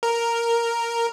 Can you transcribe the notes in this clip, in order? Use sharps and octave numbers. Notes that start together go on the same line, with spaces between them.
A#4